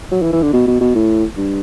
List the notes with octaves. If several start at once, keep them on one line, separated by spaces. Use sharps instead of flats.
F#3
E3
E3
D3
B2
B2
B2
A2
G2